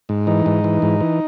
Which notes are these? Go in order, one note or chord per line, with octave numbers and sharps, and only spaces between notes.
G#2
E3 D#4
G#2
E3
G#2
E3